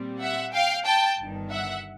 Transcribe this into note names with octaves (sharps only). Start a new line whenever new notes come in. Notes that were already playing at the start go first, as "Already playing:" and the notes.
Already playing: A#2 G3 C4
E5 F#5
F5 G5
G5 A5
G1 G2 D#3
E5 F#5